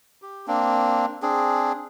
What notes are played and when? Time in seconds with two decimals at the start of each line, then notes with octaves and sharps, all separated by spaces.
0.22 G4
0.47 A#3 C4 D4
1.22 C4 D4 G#4